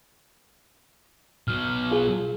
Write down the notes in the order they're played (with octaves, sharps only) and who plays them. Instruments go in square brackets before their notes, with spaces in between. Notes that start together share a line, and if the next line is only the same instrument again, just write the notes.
[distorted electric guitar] B2 F#3 [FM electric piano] F6
[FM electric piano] F4 G#4